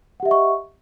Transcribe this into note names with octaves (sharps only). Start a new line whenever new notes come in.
G4 D#5 E5 F#5 C#6